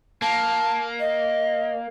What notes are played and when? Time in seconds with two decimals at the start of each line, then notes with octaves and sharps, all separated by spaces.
0.22 A#3 A5
1.00 D#5